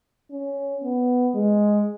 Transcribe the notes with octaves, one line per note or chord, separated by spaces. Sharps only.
C#4
B3
G#3